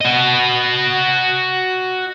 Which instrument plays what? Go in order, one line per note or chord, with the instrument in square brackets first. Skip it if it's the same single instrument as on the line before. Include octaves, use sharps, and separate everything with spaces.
[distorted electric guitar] F#4 D#5